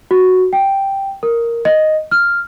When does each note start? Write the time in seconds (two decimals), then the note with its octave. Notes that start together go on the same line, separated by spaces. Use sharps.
0.11 F#4
0.53 G5
1.23 A#4
1.65 D#5
2.11 F6